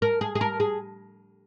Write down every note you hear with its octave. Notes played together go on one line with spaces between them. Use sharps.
A#4
G#4
G#4
A#4
G#4